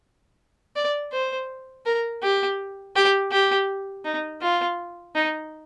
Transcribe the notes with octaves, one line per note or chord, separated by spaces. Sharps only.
D5
C5
A#4
G4
G4
G4
D#4
F4
D#4